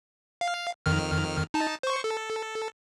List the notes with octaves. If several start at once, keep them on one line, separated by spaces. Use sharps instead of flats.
F5
F2 D#3 F6
D#4 A5
C5 C#6
A4